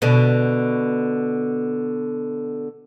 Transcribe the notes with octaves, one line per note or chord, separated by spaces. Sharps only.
B2 D3